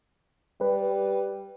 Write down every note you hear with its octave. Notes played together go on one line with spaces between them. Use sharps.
G3 B4